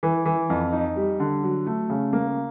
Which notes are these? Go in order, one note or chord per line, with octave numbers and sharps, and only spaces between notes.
E3
E3
F2
D#4
G3
D3
F#3
A3
C#3
A#3